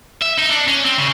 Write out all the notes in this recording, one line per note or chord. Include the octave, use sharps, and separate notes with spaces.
E5
D#4
D4
C#4
C4
C#3